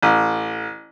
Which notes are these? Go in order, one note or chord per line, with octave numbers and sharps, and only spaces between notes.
A1